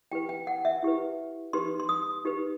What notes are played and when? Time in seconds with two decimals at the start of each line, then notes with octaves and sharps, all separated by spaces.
0.12 E4 G4 B4 G5
0.29 G5
0.47 F#5
0.65 E5
0.83 E4 G4 B4
1.53 D#4 G4 B4 C6
1.80 C6
1.89 D#6
2.25 D#4 G4 B4